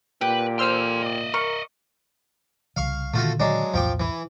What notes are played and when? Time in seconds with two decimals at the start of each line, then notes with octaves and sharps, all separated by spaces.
0.21 A#2 G4 B4
0.59 A4 C5 C6 E6 F6
1.02 D5 D#5
1.34 A#4 C#6
2.76 C2 C#3 F5 C#6
3.14 A#2 D3 D#3 A3 F4 F#4
3.40 F#3 G#3 D4
3.74 B1 E2 A2 F3 G5 D6
4.00 E3